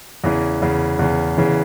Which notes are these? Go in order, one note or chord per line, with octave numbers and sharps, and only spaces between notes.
E2 C#3 E3
E2 C#3 E3
E2 C#3 E3
E2 C#3 E3